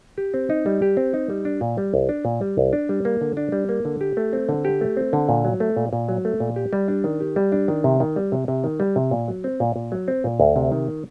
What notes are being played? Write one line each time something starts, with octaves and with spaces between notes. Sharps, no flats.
G4
C4
D#4
G3
G4
C4
D#4
G3
D4
A#2
G3
C2
D4
A#2
G3
C2
D4
G3
A#3
D3
D4
G3
A#3
D3
G4
A3
C4
D3
G4
A3
C4
D3
A#2
F#3
A3
A#2
A#2
F#3
A3
A#2
G4
G3
D4
D#3
G4
G3
D4
D#3
C3
D#3
G3
C3
C3
D#3
G3
C3
A#2
F#3
C4
A#2
A#2
F#3
C4
A#2
D2
C3
D#3